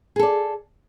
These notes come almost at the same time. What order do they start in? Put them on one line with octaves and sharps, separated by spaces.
G#4 A4 D5